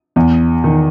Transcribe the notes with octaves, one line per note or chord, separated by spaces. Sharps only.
E2
D#3